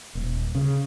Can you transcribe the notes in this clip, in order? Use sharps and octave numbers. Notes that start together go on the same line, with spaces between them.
D#1
C#3